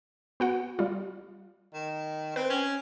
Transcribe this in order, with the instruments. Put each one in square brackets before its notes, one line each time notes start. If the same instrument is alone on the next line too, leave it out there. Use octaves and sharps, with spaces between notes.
[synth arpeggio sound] B3 F#4 F#5
G3 F4
[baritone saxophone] D#3
[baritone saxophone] C4 [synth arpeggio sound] B4
[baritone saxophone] C#4